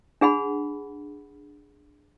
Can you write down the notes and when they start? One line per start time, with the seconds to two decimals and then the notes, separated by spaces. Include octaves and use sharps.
0.21 D4 G#4 F#5 B5